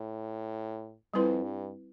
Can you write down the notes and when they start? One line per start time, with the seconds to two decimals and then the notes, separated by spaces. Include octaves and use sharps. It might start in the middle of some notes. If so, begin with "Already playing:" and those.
Already playing: A2
1.14 F2 G3 C4 E4 B4
1.43 G2